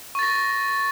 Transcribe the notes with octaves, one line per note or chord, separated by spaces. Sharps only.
C#6 A6 A#6